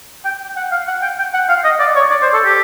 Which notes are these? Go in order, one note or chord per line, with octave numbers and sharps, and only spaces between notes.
G5
F#5
F5
F#5
G5
G5
F#5
F5
D#5
D5
C#5
D5
C5
A4
G4